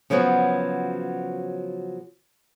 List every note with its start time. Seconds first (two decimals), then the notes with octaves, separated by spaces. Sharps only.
0.10 C#3 F3 F#3 B3 F#4